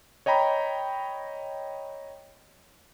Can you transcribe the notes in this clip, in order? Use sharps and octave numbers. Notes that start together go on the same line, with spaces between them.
C#5 D#5 G5 A#5 B5